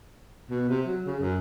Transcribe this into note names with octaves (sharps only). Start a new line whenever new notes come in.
B2
C3
F#3
C#3
F#2